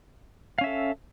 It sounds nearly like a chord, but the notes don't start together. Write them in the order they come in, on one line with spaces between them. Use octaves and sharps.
F5 C#4 E5 A4